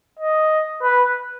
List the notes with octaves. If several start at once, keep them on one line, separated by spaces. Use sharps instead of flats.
D#5
B4